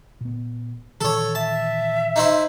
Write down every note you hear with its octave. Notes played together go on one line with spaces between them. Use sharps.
A#2 B3
A#2 D#3 E3 A4 C#5
E5 A5
D#4 E4 C5